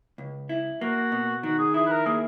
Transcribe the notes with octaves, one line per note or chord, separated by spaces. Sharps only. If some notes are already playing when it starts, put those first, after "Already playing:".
C#2
E4
A#3 F#4
B2
D#3 F#4
G#4
E4 G#4
B4
A#4
A#3 G#4